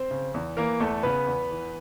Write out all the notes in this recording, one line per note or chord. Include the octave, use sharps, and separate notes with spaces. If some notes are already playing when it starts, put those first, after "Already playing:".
Already playing: C4 C5
C#3
E2
E3 A#3 A#4
E2 A3 A4
C#3 B3 B4
E2
E3